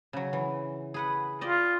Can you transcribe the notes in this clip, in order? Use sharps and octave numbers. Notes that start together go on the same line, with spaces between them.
C#3 F#3
E3
G#4 B4 F#5
F4 G4 D5 D#5